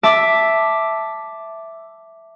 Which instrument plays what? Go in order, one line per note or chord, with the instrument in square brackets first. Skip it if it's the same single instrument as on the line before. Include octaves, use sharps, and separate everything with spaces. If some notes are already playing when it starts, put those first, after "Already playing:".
[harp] E5 A5 D6